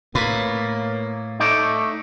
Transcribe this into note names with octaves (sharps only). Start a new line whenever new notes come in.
A2 A#3 B4
A3 D#4 D5